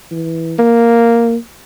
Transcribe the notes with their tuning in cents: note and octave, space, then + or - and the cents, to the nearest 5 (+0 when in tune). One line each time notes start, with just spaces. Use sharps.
E3 -10
A#3 +0